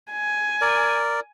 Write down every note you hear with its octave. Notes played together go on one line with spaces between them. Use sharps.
G#5
A#4 D5